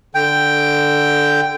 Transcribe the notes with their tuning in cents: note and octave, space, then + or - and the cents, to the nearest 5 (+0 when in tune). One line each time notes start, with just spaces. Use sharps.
D3 +0 G5 +0